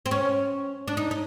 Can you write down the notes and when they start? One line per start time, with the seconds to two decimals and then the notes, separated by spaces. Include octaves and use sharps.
0.06 C4
0.11 C#4
0.88 D4
0.97 D#4
1.11 D#4